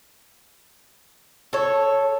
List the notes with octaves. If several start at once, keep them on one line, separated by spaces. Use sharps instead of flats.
A4 C#5